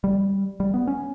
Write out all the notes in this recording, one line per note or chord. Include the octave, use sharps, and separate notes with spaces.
G3
G3
B3
C#4